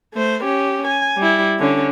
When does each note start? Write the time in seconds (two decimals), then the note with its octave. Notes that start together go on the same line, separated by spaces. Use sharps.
0.14 A3 C5
0.44 C#4 G4
0.87 G#5
1.17 G3 E4
1.58 D3 C#4